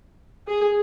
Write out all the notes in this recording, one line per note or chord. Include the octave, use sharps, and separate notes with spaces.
G#4